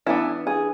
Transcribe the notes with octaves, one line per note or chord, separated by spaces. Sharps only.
E3 B3 D4 E4
G#4